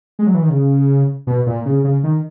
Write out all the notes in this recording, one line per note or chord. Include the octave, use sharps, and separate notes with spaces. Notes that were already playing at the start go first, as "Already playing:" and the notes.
G#3
F#3
E3
D#3
C#3
B2
A#2
C#3
C#3
D#3